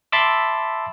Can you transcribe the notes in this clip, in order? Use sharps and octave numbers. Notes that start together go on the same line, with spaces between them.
E5 A5 B5 C6 D6 E6